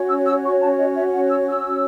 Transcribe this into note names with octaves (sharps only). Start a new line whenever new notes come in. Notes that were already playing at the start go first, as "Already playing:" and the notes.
Already playing: C#4 F#4 C#5
E6
E6
C#6
A5
D#5
E5
F#5
E6
E6